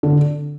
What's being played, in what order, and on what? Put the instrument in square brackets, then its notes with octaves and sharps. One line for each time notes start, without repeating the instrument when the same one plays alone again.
[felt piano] D3